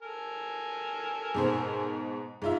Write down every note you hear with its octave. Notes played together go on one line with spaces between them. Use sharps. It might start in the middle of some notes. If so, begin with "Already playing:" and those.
A4 A#4 G#5
G#2 B2 C5
G#2 F4 E5